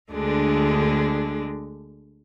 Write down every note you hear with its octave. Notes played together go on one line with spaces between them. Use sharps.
D2 D3 G#3 D4